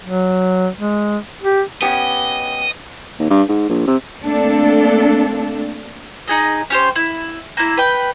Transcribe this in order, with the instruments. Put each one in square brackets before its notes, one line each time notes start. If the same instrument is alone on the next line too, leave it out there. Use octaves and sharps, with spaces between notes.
[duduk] F#3
G#3
G4
[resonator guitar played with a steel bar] B3 C#4 G4 [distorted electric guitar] D#5
[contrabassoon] D#2
G2
G#2
A#1
C3
[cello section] A3 A#3 C4 D4 A4
[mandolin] D#4 G#4 D#5
C#4 G4 C5
E4
A#3 E4
B4 G5